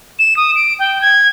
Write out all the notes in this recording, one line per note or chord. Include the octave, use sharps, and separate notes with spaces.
E7
D#6
D7
G5
G#6